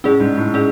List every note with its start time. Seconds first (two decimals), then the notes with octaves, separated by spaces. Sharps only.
0.04 A2 C#4 G#4 D5
0.20 G#2
0.38 A2
0.54 C#4 G#4 D5